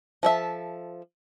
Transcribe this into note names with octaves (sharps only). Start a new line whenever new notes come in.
F3 A4 E5